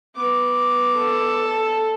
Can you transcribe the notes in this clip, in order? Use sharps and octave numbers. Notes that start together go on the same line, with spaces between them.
B3 D6
A4